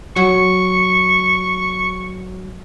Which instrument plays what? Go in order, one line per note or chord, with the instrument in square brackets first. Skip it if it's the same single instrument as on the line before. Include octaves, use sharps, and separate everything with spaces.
[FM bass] F#3 [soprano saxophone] C#6